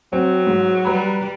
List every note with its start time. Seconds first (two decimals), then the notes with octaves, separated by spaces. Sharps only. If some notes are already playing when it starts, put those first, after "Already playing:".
0.13 F#3 C4
0.47 G#2
0.85 G3 B4 A#5 B5